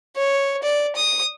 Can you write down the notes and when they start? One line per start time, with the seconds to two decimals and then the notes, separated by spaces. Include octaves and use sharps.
0.16 C#5
0.63 D5
0.96 D#6